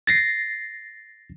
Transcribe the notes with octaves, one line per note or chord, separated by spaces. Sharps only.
A6 A#6 C7